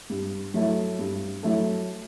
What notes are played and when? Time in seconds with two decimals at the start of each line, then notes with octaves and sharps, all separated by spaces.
0.10 G2
0.54 F#3 A3 E4 A4
0.99 G2
1.43 F#3 A3 E4 A4